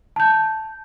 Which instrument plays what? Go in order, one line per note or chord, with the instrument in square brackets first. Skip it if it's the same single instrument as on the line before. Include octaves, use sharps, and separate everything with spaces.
[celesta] A5 G6